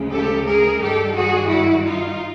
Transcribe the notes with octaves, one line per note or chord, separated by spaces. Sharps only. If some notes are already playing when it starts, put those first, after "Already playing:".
Already playing: D2 C#3 F3 G#3
G4 A4
G#4 A#4
G2 D#3 G3 G4 A4
F#4 G#4
E4 F#4
D#4 F4